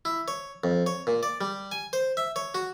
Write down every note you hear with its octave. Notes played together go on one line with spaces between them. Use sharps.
E4
C#5
F2
C#5
A#2
D5
G3
G#5
C5
E5
C#5
F#4